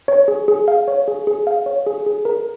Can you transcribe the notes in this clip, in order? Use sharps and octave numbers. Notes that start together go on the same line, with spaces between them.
C#5
G#4
G#4
F5
C#5
G#4
G#4
F5
C#5
G#4
G#4
A#4